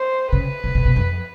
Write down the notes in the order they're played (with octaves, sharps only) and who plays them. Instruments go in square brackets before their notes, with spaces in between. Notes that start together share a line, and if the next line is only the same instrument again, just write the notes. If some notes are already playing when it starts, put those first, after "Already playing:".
Already playing: [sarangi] C5
[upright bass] C#3 [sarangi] B4
[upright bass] C#3
C3
B2
F2